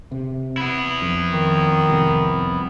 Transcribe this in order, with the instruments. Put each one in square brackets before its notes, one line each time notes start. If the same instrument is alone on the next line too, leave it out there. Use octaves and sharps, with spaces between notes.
[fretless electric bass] C3
[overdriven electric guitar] B3 E4
[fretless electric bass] F2
[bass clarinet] D#3
[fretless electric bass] C2 F2